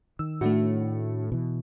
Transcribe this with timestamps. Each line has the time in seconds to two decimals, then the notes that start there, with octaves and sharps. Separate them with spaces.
0.19 D#3 E6
0.41 A2 A3 D4 F#4
1.32 B2 E3